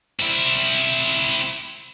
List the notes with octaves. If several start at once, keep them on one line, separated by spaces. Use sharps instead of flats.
C4 E4